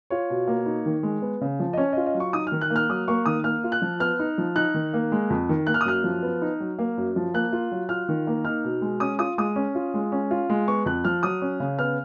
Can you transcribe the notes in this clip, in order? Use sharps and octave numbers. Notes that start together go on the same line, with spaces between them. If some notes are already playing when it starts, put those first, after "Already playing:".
F4 C#5
B2
A#3
D#4
D#3
G#3
B3
C#3
F3
D#5
C#4 C#5
F4 D#5
D#5
F#3
C#6
D#4 D#6
F6
D#3
F#6
A#3
F6
F#3 D#6
A#3 C#6
D#3 D#6
A#3 F6
F4
F#6
F3
B3 F6
D#4
F3
D#4 F#6
D#3
A#3
G#3
F2
D#3
A#3 F#6
F6
D#6
F#2 F6
F3
B3
D#4
F#3
A#3
F#2
F3
A#3 F#6
F4
F#3
F4 F6
D#3
A#3
D#4 F6
B2
G#3
C#4 D#6
F4 D#6
G#3 D#6
C#4
F4
G#3
C#4
F4
G#3
B3 C#6
F2 F#6
F3 F6
F#3 D#6
C#4
C#3
B3 F6